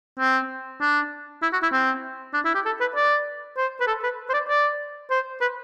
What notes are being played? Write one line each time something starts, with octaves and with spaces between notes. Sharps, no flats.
C4
D4
E4
F#4
E4
C4
D4
E4
G4
A4
B4
D5
C5
B4
A4
B4
C5
D5
D5
C5
B4